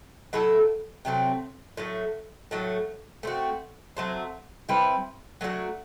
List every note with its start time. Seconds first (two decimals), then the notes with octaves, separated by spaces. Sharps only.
0.33 F#3 A3 E4 A4
1.05 C3 F#3 A3 C4
1.77 A2 F#3 A3
2.51 A2 F#3 A3
3.23 A3 C4 F#4
3.97 F#3 A3 C4
4.69 G3 C4 E4 B4
5.41 F#3 A3 D4 F#4